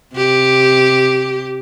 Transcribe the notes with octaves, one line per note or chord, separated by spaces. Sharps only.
C3 G4